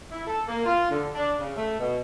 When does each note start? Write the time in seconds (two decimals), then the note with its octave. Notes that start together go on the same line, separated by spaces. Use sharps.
0.11 E4
0.27 A4
0.48 A#3
0.66 F4
0.90 D3
1.15 D4
1.40 C#3
1.56 A3
1.79 B2